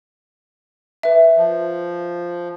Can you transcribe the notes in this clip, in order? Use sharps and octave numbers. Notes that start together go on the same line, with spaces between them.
B4 E5
F3